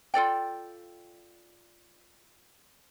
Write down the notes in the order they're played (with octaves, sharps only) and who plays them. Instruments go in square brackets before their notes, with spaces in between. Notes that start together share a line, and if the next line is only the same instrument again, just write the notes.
[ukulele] F4 A4 D5 G5